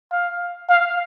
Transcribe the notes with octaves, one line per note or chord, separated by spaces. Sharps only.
F5
F5